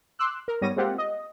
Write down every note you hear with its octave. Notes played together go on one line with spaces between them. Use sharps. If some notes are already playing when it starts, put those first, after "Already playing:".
C6 D6 E6 F#6
A#4
G#2 G3 B3 C#5 A#6 D#7
G#3 A#3 C4 F4 G4 F#5
D#5